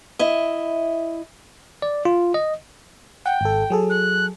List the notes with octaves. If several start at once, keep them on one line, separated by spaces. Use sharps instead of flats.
E4 D#5
D5
F4
D#5
F#5 G5
G#1 A4
F#3 G#4 A4
F#6